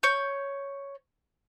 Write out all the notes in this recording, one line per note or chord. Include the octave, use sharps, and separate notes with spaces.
C#5 G6